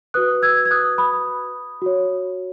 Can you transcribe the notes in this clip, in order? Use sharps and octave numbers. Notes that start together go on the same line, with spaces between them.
F#4 B4 D#6 F#6
E6 G#6
G#6
D#6 F#6
B5 D#6
F#4 C#5